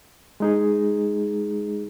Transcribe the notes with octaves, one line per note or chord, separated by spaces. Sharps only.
G#3 D#4 G#4